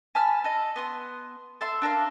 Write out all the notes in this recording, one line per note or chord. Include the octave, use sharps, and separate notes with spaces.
G#5 A5 B5 F6
A4 D#5
B3 C6 D#6
A4 E5 C6
D4 A4 A#4 F5